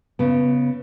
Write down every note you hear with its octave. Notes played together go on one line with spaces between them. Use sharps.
C#3 B3